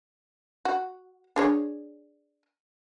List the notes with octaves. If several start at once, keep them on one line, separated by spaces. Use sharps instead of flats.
F#4
D4 G#4 C#5